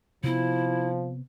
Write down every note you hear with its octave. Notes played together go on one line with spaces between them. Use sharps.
C3 F3 B3 E4